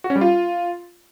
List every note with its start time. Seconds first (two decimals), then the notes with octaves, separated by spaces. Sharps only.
0.04 F#4
0.10 C#4
0.16 G3
0.21 F4